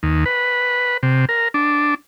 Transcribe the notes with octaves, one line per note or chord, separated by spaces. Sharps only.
D#2
B4
C3
A#4
D4